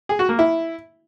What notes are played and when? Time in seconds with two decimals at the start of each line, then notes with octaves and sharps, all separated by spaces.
0.09 G#4
0.19 F#4
0.29 A#3
0.39 E4